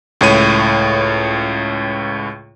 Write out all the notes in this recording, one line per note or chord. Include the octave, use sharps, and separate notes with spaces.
C#2 A2 C#5 D#7